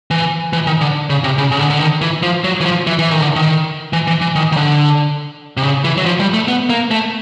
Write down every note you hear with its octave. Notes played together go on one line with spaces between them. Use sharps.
E3
E3
D#3
D3
C#3
C3
C#3
C#3
D3
D3
D#3
E3
F3
F#3
E3
F3
E3
E3
D#3
D3
D#3
E3
E3
E3
D#3
D#3
D3
C3
C#3
E3
F#3
F3
G3
A3
B3
A#3
A3